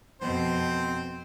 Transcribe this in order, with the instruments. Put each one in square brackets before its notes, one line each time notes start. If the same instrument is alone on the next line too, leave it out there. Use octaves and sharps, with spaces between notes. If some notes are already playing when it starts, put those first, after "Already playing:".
[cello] F2 B2 [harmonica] C4 C5